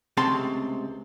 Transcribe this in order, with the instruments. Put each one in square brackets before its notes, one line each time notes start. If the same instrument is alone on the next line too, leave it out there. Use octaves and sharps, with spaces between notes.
[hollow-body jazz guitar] C#2 C3 A3 C4 A5 C6